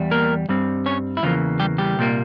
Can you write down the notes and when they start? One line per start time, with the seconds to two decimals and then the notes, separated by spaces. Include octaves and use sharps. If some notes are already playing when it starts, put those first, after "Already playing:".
Already playing: E2 G3
0.11 A#3 A#4
0.49 G2 G3 C4
0.86 C#4 C#5
1.17 E4
1.23 E2 C#3 E3 F3 A#3 F4
1.60 G3 G4
1.78 G3 G4
1.97 C2 A#2 G3 A#3